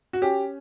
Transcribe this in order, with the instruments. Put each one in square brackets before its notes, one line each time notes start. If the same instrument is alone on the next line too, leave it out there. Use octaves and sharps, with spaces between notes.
[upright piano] F#4
C#4 G4